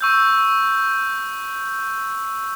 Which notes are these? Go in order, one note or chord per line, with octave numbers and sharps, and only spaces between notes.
C#6 E6 G6